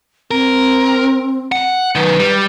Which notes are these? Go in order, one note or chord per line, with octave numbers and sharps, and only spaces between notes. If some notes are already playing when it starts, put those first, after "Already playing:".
C4 A#4
F#5
F#2 D#3 B4
G3